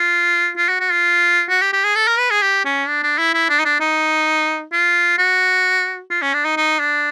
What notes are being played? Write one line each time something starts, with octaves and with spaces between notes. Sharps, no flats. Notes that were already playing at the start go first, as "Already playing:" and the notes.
Already playing: F4
F4
F#4
F#4
F4
F#4
G4
G4
G#4
A4
A#4
B4
G#4
G4
C#4
D4
D4
E4
E4
D4
D#4
D4
D#4
F4
F#4
F4
C#4
D4
D#4
D#4
D4